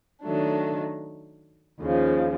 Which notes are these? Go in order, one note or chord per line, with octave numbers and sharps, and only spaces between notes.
D#3 F#3 A3 D4
D#2 C#3 F3